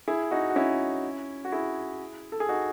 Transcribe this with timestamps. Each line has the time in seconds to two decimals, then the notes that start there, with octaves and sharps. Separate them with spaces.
0.08 E4 G#4
0.31 D#4 F#4
0.50 F#4
0.56 C#4 E4
1.45 F#4
1.52 E4 G#4
2.32 A4
2.40 G#4
2.49 D#4 F#4